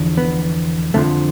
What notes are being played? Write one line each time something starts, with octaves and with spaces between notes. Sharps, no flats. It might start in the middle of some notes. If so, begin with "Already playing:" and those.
Already playing: E2 D3 F3
B3
F2 D3 F3 A3